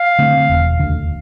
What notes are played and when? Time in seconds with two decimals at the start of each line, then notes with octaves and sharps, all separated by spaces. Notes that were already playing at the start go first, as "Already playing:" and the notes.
Already playing: F5
0.19 D3 A3 C4
0.49 E1
0.79 D2 D3